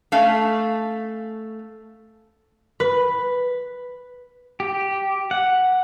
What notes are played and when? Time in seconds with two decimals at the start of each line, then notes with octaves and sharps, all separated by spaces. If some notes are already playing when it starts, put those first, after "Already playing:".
0.12 A3 C#4 F5
2.80 B4
4.60 G4
5.31 F#5